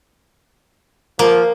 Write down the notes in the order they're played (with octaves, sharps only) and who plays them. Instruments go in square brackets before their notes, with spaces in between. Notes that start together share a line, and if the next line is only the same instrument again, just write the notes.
[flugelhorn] F3 [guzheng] A#3